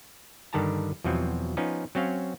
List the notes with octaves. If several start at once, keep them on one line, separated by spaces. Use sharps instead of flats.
G2 D3 D#3 G4 A5 A#5
E2 B2 F3 F#3 C4
F3 B3 C#4 D#4
F#3 C4 C#4 F5